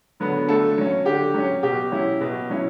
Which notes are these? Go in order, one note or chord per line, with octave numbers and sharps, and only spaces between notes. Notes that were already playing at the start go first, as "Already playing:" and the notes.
D3 F#3 B3
D3 A3 A4
F#3 C#4
D3 G4
F#3 C#4
B2 G4
F#3 C#4 E4
B2
F#3 C#4 E4